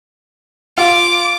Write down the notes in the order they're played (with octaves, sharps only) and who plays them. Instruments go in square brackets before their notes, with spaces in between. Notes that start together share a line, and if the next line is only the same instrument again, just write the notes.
[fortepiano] F4 [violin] D6